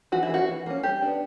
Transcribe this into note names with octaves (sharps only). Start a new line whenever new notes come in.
E3 F#4
E4
A#3 C#4 F#4
E3
A#3 C#4
G3 G4
B3 D4